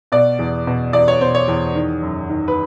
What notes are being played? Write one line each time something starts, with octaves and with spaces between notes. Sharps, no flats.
B2 D5
E2
B2
E2 D5
C#5
B2 C5
C#5
E2
D#3
F#2
D#3
B4